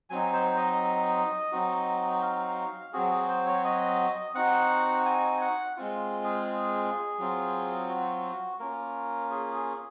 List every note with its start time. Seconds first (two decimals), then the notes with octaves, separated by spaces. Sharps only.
0.10 F#3 C4 D#4 G#5
0.33 C5
0.57 D#5
1.52 F#3 C4 D#4 F#4
2.23 F5
2.93 F#3 C4 F#4 G#4
3.11 G#4
3.29 C5
3.46 C#5
3.64 D#5
4.34 C4 D#4 F#4 F#5
5.06 G#5
5.41 F#5
5.77 G#3 C4 F4
6.24 G#4
7.18 F#3 C4 F4
7.89 F#4
8.60 A#3 C#4 F4 A#4
9.30 G#4
9.54 G#4